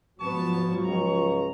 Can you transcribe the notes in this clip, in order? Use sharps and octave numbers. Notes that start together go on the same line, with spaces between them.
G#2 F3 F#3 B3 A5 C#6
C#2 A#5